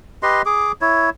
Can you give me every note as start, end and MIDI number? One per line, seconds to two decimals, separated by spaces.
0.23 0.42 67
0.23 0.42 71
0.23 0.42 75
0.23 0.42 84
0.46 0.72 68
0.46 0.72 86
0.81 1.10 64
0.81 1.10 73